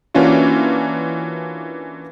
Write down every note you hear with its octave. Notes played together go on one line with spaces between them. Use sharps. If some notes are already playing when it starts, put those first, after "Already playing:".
E3 A#3 C#4 D4 F4 F#4